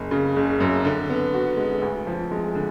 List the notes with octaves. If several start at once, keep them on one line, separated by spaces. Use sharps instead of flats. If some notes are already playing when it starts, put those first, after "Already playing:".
Already playing: F#1
C#3
F#1
F#2
D3
B3
F#4
G#3
D2
F3
G#3
D3